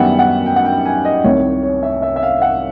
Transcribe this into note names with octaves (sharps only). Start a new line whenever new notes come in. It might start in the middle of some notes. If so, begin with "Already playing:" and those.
Already playing: F#2 D#3 G3 B3 E5 F#5
F#5
G5
F#5
G5
G#5
D#5
C2 C3 D#3 C#5
C#5
E5
E5
E5
F5
F#5